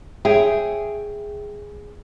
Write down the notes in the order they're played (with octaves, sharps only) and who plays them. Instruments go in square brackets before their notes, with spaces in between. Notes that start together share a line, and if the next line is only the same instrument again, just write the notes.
[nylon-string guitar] G#4 [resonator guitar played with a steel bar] C#5 E5 G5